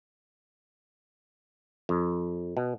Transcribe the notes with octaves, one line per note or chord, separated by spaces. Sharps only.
F2
B2